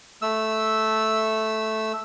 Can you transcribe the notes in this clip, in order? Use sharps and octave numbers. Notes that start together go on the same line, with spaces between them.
A3 E6